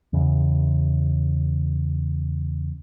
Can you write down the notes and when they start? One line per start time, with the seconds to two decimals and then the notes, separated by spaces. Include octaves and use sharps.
0.13 E2 C#3